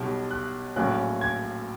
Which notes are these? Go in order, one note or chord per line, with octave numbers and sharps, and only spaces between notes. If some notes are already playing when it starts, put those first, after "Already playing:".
Already playing: B1 B2 G3
F#6
A#1 A2 F#3 A#3 C#4 F#6
G#6